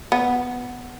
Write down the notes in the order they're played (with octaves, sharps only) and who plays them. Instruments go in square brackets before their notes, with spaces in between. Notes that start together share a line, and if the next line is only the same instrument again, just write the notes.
[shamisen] B3